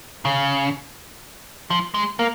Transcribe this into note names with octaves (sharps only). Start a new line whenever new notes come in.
C#3
F3
G#3
A#3